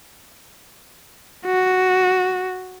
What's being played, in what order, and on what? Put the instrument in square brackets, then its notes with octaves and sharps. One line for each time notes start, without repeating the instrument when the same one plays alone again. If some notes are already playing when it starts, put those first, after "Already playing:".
[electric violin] F#4